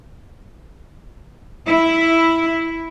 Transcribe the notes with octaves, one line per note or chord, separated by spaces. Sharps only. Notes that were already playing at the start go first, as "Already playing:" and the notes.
E4